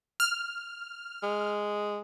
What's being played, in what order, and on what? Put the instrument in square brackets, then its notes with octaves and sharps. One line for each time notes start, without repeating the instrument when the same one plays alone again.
[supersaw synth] F6
[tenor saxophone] G#3